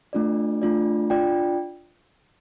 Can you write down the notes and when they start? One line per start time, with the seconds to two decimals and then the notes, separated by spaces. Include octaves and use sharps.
0.13 A3 D4 F4 D5
0.62 A3 D4 F4 D5
1.10 D4 F4 D5 G5